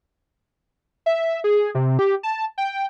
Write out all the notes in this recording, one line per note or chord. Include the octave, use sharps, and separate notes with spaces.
E5
G#4
C3
G4
A5
G5